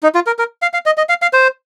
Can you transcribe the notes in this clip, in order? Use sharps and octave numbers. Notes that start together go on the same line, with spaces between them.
D#4
F4
A#4
A#4
F5
F5
D#5
D#5
F5
F5
C5